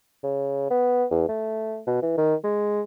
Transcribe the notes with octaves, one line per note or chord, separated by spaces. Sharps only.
C#3
B3
E2
A3
B2
E3
D#3
G#3